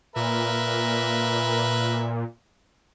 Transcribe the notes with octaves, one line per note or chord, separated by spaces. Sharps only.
A#2 A#4 B4 E5